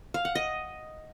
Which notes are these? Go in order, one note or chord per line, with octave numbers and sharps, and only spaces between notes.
F5
F#5
D#5